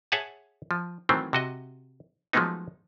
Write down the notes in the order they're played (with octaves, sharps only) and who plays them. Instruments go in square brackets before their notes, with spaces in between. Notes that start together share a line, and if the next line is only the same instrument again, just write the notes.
[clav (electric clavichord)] G#4 C#5 E5 F#5 G#5 A5
F3
D#3 E3 F#3 A3 C4
C3 F#4 D#5
F3 F#3 G#3 A3 B3 D#4